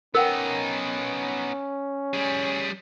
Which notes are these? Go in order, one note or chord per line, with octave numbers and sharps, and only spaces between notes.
B3 C#4 D#4 A#4 F#5 G5
G3 G#4